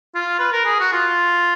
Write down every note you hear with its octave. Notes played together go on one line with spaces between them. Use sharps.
F4
B4
A#4
G#4
F#4
F4